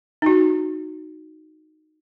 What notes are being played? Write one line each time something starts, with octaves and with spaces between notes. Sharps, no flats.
D#4 F#4